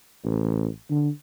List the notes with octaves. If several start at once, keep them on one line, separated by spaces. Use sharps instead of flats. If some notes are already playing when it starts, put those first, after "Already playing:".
A1
D3